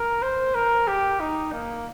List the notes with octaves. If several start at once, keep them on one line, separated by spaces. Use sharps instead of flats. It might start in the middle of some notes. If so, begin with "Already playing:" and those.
Already playing: A#4
C5
A#4
G4
D#4
A#3